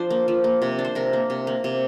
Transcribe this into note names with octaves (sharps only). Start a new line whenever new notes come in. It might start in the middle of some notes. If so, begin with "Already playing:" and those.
Already playing: F3 D4 C5
A#3
F3
A#3
C3
D4
C5
C3 A#4
A#3
C3
A#3
C3